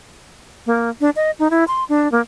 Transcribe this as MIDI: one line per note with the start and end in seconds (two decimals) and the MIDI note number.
0.66 0.90 58
1.01 1.10 62
1.16 1.31 75
1.39 1.48 63
1.51 1.64 64
1.68 1.84 84
1.89 2.11 62
2.12 2.21 58